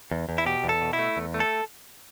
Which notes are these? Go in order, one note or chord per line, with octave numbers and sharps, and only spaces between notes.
E2
E2
E4
B2 G4
E2
A4
B2
E4
A3
E2
A3
A4